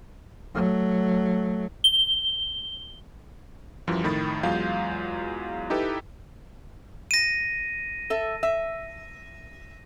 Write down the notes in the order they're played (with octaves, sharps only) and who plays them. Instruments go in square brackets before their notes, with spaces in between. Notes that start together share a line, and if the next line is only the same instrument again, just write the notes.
[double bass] F#3 A3
[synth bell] G7
[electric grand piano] F#2 E3 F3 G3
F2 A2 D#3 B5 A6
E2 F#3 G#3 F4 F5 G6
D#4 E4 G4 A4 B4
[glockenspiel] A#6 D#7
[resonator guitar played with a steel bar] A4 E5
E5